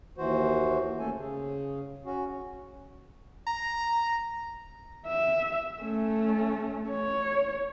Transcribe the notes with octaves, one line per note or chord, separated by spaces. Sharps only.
D#2 E3 F#4 C5
D#2 A3 C#4 A4 G#5
C#3
C#4 F#4
A#5
E5
A3 C#4
C#5